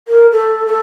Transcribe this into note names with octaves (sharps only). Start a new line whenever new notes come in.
A#4
A4
A4